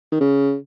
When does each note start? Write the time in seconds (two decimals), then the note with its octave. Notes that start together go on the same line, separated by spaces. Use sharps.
0.12 D#3
0.20 C#3